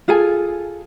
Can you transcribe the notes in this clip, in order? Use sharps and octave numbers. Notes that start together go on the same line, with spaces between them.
F4 G#4 A4 G#5